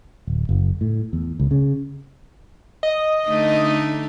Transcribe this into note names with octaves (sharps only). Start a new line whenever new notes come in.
D1
F#1
A2
E2
C#2
C#3
D#5
D3 A3 D#4